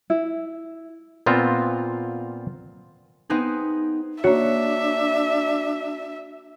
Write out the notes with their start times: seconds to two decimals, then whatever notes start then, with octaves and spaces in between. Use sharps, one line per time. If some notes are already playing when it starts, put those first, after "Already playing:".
0.10 E4
1.26 A#2 B3 C4 F4
3.30 B3 C4 D#4 G#4
4.24 A#3 D4 F#4 C#5 E5